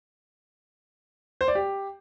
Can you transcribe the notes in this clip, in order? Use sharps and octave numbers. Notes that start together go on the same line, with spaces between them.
C5
D5
G4